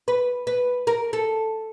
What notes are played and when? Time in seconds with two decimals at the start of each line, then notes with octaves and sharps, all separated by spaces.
0.08 B4
0.47 B4
0.87 A#4
1.13 A4